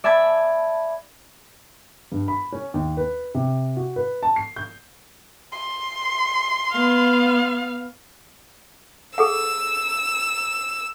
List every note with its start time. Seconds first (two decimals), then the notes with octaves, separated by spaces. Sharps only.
0.04 D5 E5 A5 B5 G#6 B6
2.12 G2
2.28 B5
2.52 C#4
2.74 D#2
2.97 B4
3.35 C3
3.77 F#4
3.96 B4
4.23 A5
4.36 C7
4.56 G6
5.52 C6
6.71 B3 F5
9.18 G#4 A4 F#5 E6